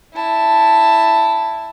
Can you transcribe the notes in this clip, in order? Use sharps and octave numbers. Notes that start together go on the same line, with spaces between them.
E4 A5